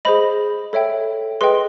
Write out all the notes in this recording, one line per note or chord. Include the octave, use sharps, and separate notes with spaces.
G#4 C5 D#5 B5
A4 C#5 E5 G5
G#4 B4 D#5 G5 C6